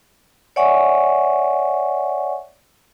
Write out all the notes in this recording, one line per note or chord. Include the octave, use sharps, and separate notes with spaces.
C#5 D5 E5 F#5 G#5 C#6